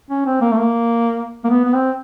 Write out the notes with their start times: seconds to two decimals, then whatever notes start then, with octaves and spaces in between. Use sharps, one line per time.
0.10 C#4
0.26 C4
0.41 A#3
0.51 A3
0.57 A#3
1.44 A#3
1.50 B3
1.65 B3
1.74 C4